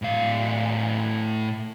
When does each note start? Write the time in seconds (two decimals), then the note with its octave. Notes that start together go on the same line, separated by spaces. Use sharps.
0.02 A2 F5